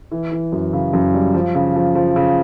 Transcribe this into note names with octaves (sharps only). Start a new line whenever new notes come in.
E3
E3
F#2
C#3
F#2
G3
F3
C#3
F3
F3
C#3